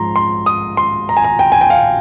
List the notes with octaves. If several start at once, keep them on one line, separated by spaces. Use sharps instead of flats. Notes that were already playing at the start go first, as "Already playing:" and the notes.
Already playing: G#2 F3 A#5 C6
C6
D#6
C6
A#5
G#5
A#5
G5
G#5
G5
F5